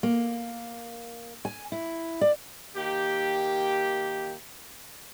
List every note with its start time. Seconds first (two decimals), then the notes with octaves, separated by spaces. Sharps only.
0.03 A#3
1.45 G#5
1.72 E4
2.21 D5
2.75 D#3 A#3 G4